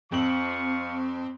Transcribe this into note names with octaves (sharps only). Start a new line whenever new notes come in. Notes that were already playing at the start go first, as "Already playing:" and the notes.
F2 C4 F4 C#6 F#7